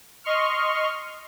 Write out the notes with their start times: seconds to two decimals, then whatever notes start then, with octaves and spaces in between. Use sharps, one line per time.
0.24 D#5 C6 C#6 F6